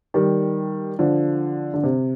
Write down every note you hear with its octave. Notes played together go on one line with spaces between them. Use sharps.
D#3 G3
D3 F3
D3
C3